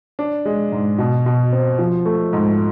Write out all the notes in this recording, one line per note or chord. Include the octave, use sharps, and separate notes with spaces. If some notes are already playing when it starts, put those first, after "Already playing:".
D4
G#3
G#2
B2
B2
C4
F3
A3
G#2